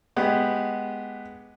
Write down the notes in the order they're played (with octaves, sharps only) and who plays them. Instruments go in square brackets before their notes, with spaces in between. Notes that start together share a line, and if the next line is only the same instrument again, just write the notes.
[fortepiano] G#3 B3 G4